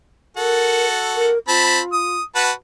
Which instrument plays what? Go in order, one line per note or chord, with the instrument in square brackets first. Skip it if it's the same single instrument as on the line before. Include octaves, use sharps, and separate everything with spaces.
[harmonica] F#4 A4 [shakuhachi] A#4
[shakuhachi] A#4
[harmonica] C4 A5 B5 [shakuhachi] F4
[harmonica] D#6
F#4 B4 A5